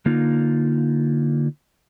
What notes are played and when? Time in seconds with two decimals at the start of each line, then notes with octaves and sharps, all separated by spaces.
0.06 D3 A#3 D#4 F4